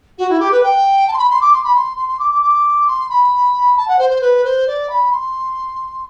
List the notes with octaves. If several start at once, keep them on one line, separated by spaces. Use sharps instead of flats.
F#4
E4
G4
B4
G5
A5
C6
B5
C6
D6
C6
B5
C6
C6
C6
D6
D6
D6
C6
B5
A5
F#5
C5
C5
B4
C5
D5
B5
C6